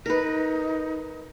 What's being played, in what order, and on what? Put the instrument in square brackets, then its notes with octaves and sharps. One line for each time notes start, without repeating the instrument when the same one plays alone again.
[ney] D#4 [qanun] A#4 B4